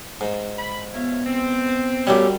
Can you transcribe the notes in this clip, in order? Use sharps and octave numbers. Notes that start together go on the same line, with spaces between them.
G#2
B5
B3 F4 C#5 E5
C4
F#2 G3 A3 C#4 D4 G4 E5